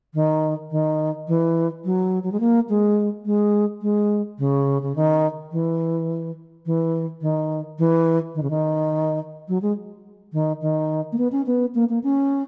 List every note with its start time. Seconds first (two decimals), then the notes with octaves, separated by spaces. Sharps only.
0.14 D#3
0.71 D#3
1.28 E3
1.85 F#3
2.23 F#3
2.32 G#3
2.40 A#3
2.69 G#3
3.25 G#3
3.82 G#3
4.38 C#3
4.82 C#3
4.96 D#3
5.52 E3
6.66 E3
7.21 D#3
7.79 E3
8.35 D#3
8.42 C#3
8.50 D#3
9.48 F#3
9.62 G#3
10.33 D#3
10.61 D#3
11.12 A#3
11.18 B3
11.32 C#4
11.46 B3
11.75 A#3
11.89 A#3
12.03 C#4